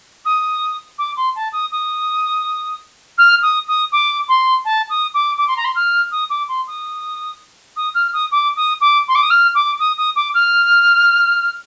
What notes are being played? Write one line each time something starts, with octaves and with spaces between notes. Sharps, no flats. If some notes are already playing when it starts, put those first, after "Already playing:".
D#6
D6
C6
A5
D#6
D#6
F6
D#6
D#6
D6
C6
A5
D#6
D6
D6
C6
A#5
C6
F6
D#6
D6
C6
D#6
D#6
F6
D#6
D6
D#6
D6
C6
D6
D#6
F6
D6
D#6
D#6
D6
F6